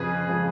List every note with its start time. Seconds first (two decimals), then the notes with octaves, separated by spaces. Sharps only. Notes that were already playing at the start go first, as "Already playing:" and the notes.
Already playing: F2 C#3 F3 G#4 B4
0.28 C#3 F3